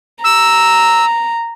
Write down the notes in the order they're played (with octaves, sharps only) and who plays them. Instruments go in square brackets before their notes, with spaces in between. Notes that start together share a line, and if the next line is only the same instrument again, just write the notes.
[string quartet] A#5 [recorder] E6